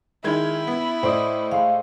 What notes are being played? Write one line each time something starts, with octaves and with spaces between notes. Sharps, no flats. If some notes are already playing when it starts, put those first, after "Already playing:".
D#3 G#3 E4 G#6
B3
A2 C5 D5 D#5
G#3 F5 C6